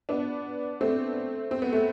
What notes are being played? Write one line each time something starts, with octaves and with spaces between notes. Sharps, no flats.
B3 D4
A3 C4
C4
B3
A3